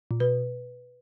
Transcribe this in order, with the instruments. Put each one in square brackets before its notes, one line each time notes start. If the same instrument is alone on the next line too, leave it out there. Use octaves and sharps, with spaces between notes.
[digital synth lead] A#2
[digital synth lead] B2 [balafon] B4